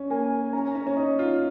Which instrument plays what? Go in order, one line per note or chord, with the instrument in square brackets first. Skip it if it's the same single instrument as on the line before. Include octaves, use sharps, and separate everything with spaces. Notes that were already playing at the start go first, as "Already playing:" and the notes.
Already playing: [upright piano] C#4
[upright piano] A#3 [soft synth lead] G#5
[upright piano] C#4 [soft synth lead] A#5
[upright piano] C#4
C#4
D#4
F4